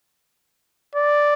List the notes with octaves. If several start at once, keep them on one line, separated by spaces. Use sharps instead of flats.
D5